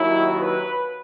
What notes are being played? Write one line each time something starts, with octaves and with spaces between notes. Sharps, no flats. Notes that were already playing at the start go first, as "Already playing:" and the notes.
Already playing: D#2 D#3 F#3 E4
B4